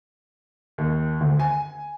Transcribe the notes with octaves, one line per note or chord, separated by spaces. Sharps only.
D#2
D2
G#5